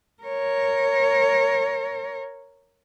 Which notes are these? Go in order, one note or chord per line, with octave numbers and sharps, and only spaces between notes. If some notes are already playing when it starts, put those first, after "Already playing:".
A#4 C#5